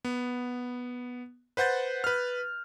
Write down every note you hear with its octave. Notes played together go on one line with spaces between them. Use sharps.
B3
B4 C5 F#5 G6 A6
B4 F6